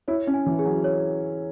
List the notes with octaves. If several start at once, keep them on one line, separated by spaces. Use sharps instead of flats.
E4 C#5
C#4
G#5
E3
G#4
F#3
C#5